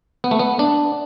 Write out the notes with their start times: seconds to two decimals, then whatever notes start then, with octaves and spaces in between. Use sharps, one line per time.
0.24 B3
0.31 A3
0.39 B3
0.59 D4